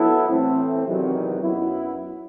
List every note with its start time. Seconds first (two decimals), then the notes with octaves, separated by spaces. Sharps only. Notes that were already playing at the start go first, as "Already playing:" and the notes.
Already playing: F#3 B3 E4 A4
0.27 A2 E3 A3 C4
0.84 E2 C3 D#3 F#3 B3
1.41 F#2 F#3 B3 E4